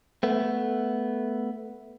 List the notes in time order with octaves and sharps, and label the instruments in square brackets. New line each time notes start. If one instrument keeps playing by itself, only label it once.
[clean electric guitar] A3 B3